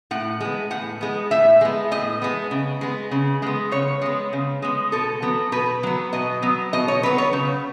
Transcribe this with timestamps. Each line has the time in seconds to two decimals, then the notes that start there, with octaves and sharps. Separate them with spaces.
0.11 A2 F#5
0.40 G#3 B3
0.71 A2 F#5
1.01 G#3 B3
1.31 A2 E5
1.61 G#3 B3
1.92 A2 D#5
2.22 G#3 B3
2.51 C#3
2.81 G#3 B3
3.11 C#3
3.42 G#3 B3
3.72 C#3 C#5
4.02 G#3 B3
4.33 C#3
4.62 G#3 B3
4.92 B2 A4
5.22 F#3 B3
5.52 B2 B4
5.83 F#3 B3
6.13 B2 D#5
6.42 F#3 B3
6.73 B2 D#5
6.88 C#5
7.03 F#3 B3 B4
7.18 C#5
7.33 C#3